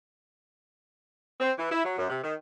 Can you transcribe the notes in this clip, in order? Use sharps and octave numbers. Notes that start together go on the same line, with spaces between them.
C4
E3
E4
F#3
F#2
C3
D#3